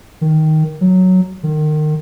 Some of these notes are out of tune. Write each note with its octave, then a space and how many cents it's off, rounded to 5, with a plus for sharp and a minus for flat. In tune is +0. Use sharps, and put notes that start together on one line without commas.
D#3 +5
F#3 +0
D#3 -30